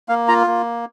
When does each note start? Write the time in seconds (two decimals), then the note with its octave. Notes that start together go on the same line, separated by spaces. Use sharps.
0.09 A#3 F5
0.28 F4 A#5
0.47 A#3